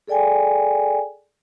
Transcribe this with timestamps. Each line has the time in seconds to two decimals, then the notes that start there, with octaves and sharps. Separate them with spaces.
0.07 G#4 A4 D5 G5 G#5